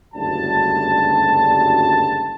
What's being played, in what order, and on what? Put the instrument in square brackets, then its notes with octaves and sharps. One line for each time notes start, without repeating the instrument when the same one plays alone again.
[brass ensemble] F#1 D2 G2 G3 A5